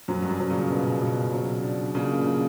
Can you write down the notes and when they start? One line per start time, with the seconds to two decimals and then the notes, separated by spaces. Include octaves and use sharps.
0.08 F#2 F#3
0.22 G2
0.29 F#2
0.40 F#3
0.50 A#2 C#3
0.70 B2
1.01 B2
1.33 F#3
1.63 D4
1.94 A#2 C#3 A#3
2.26 F#3